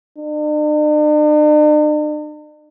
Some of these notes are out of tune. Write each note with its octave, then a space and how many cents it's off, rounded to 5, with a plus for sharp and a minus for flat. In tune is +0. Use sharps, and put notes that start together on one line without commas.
D4 +45